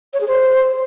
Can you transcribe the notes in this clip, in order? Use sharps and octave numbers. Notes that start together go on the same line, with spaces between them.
C#5
G#4
C5